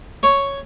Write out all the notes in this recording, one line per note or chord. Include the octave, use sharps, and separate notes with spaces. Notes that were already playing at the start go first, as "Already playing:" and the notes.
C#5